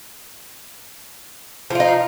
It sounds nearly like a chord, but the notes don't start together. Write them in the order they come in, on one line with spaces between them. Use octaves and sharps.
F3 F4 D#4